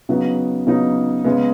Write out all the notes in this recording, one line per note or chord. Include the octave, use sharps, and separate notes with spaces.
C#3 F#3 B3 D#4
C#3 F#3 B3 D#4
C#3 G#3 B3